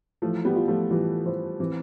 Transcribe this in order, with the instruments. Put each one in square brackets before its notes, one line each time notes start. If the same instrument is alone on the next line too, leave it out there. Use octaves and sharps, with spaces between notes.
[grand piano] E3 [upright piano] F3 A3
[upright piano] G3 B3
[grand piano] F4
[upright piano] F3 A3
[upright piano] E3 G3 [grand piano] F4
[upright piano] E3 [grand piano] C5
[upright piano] E3 [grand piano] C4